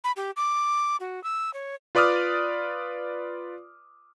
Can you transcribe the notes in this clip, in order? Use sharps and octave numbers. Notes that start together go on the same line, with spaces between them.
B5
G4
D6
F#4
E6
C#5
F4 B4 D5 D6 D#6 F6